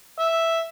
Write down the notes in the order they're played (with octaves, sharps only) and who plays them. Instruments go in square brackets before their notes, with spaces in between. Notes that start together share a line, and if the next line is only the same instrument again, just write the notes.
[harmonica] E5